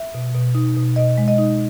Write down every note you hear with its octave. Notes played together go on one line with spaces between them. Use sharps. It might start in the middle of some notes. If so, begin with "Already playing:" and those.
Already playing: E5
B2
B2
D#4
B2
B2 D#5
G#3
D#5
D#4